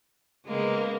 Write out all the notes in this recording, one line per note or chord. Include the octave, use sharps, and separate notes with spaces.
C#3 G#3 A#3 B3